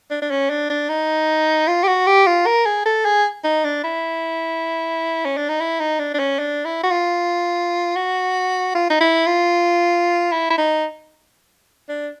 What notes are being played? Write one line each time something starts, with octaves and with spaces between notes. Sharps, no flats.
D4
D4
C#4
D4
D4
D#4
F4
G4
F#4
G4
F4
A#4
G#4
A4
G#4
D#4
D4
E4
C#4
D4
D#4
E4
D#4
D4
D4
C#4
D4
E4
F#4
F4
F#4
F4
D#4
E4
F4
E4
E4
D#4
D4